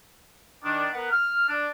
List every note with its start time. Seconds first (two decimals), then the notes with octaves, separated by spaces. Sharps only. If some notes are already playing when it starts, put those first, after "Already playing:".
0.64 D#3 D4
0.93 B3 A#4 B4 F#5
1.11 F6
1.49 D4